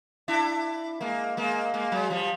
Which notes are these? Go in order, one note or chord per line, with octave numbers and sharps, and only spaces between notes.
D4 E4
G#3 A#3
G#3 A#3
G#3 A#3
F#3 G#3
F3 G3